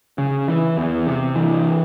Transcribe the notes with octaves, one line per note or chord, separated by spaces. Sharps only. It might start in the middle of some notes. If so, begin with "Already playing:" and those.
C#3
E3
E2
C3
E3